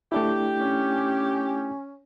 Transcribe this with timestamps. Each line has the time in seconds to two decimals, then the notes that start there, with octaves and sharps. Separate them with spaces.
0.12 A3 D4 E4 G4
0.61 C#4